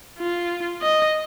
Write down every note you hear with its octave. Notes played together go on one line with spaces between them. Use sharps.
F4
D#5